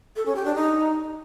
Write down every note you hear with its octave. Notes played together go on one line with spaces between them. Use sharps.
A4
C#4
G4
D4
D#4